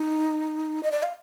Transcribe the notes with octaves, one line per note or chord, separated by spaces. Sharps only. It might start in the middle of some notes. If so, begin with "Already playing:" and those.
Already playing: D#4
D#5
D5
F5